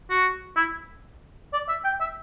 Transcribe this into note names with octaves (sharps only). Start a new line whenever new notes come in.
F#4
E4
D5
E5
G5
E5